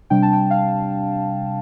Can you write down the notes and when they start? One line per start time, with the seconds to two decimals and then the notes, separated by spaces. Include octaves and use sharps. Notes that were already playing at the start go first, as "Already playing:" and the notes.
0.10 C3 G3 D4 G5
0.22 A5
0.33 G5
0.50 F5